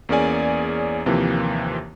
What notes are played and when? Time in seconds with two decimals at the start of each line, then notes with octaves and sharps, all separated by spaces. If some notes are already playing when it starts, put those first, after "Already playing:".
0.09 E2 A#3 C#4 G#4 D5 G#5
1.06 D#2 C3 E3 F3 A#3